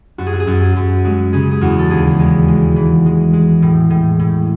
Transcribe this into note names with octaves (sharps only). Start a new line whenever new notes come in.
F#2 F#4
G#4
F#4
G#4
F#2 F#4
G#4
F#2
G#3 F#4
C#3 G#4
G#4
E2 F#4
A4
D#2 G#4
G#3
G#3
E3
G#3
G#3
A2
A2
A2